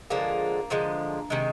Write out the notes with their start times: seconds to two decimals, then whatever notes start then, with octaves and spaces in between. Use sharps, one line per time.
0.10 D3 F3 G#3 A#3
0.70 D3 F3 G#3
1.30 C3 D#3 G#3